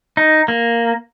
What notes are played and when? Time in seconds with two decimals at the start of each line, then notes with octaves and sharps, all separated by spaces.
0.17 D#4
0.48 A#3